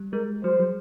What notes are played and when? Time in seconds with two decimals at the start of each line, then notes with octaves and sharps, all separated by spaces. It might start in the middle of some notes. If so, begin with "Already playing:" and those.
Already playing: G3
0.13 G#3 A#4
0.44 F#3 C5
0.59 F#3